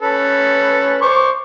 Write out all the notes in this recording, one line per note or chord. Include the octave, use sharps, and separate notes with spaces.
C#4 A4 B4
C5 C#6 D6